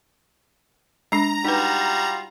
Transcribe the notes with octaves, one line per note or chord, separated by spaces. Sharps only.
G#3 D4 A#5
G3 D#4 F4 F#4 B4